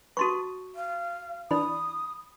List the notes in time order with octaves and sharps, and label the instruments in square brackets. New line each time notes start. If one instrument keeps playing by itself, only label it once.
[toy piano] F#4 C6 C#6 [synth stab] B4 A5 D#6
[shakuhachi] F5
[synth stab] E3 D4 [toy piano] B5 [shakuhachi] D#6